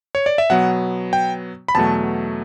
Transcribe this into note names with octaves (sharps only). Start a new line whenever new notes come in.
C#5
D5
E5
B2 F#3 B3 F#5
G5
B5
E2 B2 F#3 A3 A5